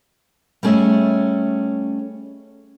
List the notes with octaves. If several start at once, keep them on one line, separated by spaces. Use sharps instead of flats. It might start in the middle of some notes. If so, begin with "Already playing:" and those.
G3 A3 C#4 G#4 D#5 E5